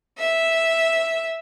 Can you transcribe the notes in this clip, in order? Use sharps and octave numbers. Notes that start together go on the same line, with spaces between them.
E5